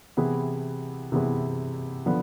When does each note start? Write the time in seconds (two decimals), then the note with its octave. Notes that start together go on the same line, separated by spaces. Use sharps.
0.17 C3 E3 B3 E4 G#4
1.12 C3 E3 B3 E4 G#4
2.06 D3 F3 B3